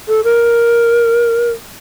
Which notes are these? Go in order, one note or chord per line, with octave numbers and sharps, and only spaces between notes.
A4
A#4